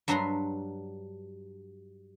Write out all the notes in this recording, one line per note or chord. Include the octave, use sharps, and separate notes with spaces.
G2 F#3 D4 B4 A#5 C6